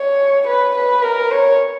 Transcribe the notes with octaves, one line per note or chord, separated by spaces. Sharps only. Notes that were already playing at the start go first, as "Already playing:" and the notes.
Already playing: C#5
B4
B4
A#4
C#5